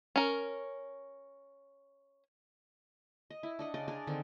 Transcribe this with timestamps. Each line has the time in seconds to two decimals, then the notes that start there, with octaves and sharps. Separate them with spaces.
0.16 C#4 A#4
3.30 D#5
3.43 E4
3.59 D4 D#5 F#5
3.74 C#3 D5 D#5 C6
3.88 D4 G#4 A#4 D5
4.07 D3 D#3 C4